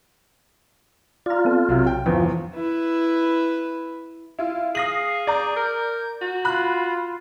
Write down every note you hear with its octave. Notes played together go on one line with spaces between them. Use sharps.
F4 D5 A#5
B3 C4 A4
B1 C3 F#3
G5
G1 E2 D3 F3
E4 B4
E4 F4
G#4 F5 D#6 A#6 F#7
D5 A#5 G6
A#4
F#4
F4 B5 F#6